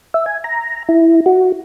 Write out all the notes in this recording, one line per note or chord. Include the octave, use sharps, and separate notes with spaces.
E5
G#5
A#5
E4
F#4